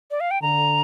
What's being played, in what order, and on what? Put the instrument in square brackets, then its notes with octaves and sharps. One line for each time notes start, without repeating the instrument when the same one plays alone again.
[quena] D5
F5
G5
[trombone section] D3 [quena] A#5